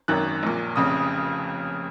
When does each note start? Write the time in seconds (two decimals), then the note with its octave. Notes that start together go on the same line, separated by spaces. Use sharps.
0.08 G#1 F#2 D#3 F#6
0.43 A#1 A#2
0.76 F1 F2 C#3 D#6